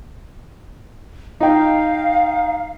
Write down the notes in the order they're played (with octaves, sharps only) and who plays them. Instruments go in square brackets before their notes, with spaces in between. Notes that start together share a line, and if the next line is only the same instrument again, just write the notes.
[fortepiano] D#4 G5 [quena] F5